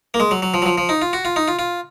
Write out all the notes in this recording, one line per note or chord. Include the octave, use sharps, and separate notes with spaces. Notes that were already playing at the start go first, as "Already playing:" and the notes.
A#3
G#3
F#3
F#3
F3
F#3
F3
F3
D#4
F4
F#4
F4
D#4
F4
F4